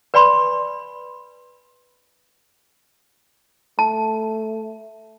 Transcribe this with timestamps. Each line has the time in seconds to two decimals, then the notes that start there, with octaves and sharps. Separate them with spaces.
0.14 B4 D5 G#5 B5 C6
3.79 A3 A5